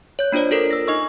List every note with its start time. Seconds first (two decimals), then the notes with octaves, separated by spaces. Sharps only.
0.19 C#5 G6
0.32 A#3 D4 F4 C5 D5
0.51 F4 A4 A#4
0.71 E6 A#6
0.87 D#4 D#5 C#6 E6